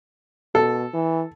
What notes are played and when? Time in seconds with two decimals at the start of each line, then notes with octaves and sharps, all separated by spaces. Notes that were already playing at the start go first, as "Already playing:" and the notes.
0.55 B2 A4
0.94 E3